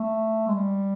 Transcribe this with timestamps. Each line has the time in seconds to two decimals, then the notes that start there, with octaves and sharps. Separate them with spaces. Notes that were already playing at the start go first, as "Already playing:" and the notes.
Already playing: A3
0.48 G#3
0.54 G3